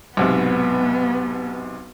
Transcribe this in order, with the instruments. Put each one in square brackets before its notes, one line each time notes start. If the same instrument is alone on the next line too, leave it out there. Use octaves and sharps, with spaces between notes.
[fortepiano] B1 G#2 C3 [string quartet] B3